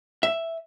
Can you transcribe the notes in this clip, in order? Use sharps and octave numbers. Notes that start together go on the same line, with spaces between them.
E5